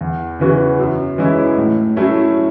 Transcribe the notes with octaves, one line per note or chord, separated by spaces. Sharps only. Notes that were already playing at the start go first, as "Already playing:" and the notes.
E2
C#3 E3 B3 F#4
F#2
E3 G#3 C#4 E4
A2
F#3 A3 C#4 E4